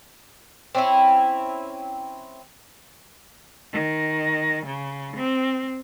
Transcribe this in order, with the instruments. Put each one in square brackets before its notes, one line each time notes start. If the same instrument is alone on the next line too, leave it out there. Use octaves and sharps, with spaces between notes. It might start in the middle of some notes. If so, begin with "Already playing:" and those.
[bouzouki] C4 C#4 E4
[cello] D#3
C#3
C4